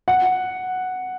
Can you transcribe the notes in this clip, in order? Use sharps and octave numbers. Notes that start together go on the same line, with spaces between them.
F#5